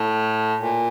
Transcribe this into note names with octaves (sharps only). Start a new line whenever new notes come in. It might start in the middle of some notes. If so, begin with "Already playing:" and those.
Already playing: A2
A#2